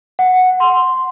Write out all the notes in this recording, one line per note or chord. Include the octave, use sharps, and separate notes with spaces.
F#5
C6